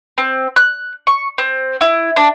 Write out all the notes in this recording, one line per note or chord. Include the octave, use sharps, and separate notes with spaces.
C4
F#6
C#6
C4
E4
D4